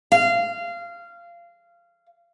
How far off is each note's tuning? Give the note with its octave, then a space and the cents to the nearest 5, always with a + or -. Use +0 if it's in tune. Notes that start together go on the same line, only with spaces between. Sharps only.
F5 -20